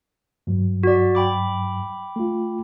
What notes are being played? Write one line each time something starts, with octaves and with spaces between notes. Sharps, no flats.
G2 F#3
F#4 D5
G5 B5 D6
A3 F4